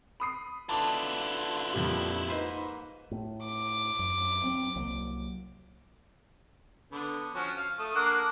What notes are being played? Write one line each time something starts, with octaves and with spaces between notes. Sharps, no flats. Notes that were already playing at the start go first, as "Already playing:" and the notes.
B5 D#6 C7
D3 E4 F4 B4 A5 D6
F2 A#2 G3
G#2 A#3 D#4 B4 C5 B5
A2
D6
F#2
F#3 C4
C2 F#3 A#3
D3 B3
F3 C#4 F#4
F5
A3 D#6
A#3 D4 F#5